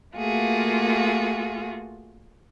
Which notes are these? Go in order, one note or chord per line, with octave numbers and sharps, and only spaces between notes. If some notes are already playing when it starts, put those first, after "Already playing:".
A3 A#3 F4 F#4 G#4